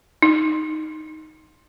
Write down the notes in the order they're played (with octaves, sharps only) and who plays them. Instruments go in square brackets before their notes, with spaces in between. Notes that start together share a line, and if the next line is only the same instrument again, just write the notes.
[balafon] D#4